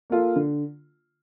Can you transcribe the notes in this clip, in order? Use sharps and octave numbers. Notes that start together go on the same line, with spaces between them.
A#3 F4 A4
D3